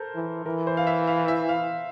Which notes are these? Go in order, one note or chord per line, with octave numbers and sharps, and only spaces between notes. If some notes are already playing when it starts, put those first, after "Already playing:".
Already playing: A4 A#4 C5
E3
E3 A#4
C5
F5
E5
F5
E5
F5